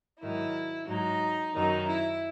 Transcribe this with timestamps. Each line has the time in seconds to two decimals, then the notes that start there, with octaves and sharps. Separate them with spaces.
0.20 G#2 D#3 F#3 E4
0.87 G#2 F#3 D#4
1.54 F#2 D#3 F#3 D#4
1.87 E4